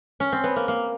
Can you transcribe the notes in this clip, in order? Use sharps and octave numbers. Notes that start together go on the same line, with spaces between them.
C#4
C4
B3
A#3
A#3